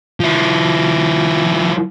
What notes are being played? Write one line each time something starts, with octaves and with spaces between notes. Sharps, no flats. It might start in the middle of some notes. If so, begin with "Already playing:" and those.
F3 E4